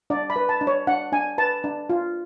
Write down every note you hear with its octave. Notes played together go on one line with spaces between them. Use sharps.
D4 D5
B5
B4
A5
D4
C#5
D4 F#5
D4 G#5
B4 A5
D4
F4